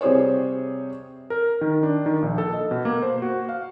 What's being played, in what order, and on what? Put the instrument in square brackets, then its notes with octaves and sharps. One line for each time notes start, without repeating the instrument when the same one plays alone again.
[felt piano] C3 G3 G#4 C5 C#5
[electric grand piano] A#4
D#3
D4
D#3
A#1
A4
D#5
B2
A#3
C5
F#4
F5